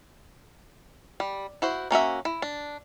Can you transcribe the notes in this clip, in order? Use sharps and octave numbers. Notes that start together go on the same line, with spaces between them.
G3
E4 F#4 C5
A#3 C#4 F#4 E5
E4
D4